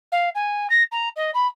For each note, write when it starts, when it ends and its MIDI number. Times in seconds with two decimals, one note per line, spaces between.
0.12 0.29 77
0.35 0.67 80
0.70 0.83 94
0.92 1.09 82
1.16 1.31 75
1.34 1.47 83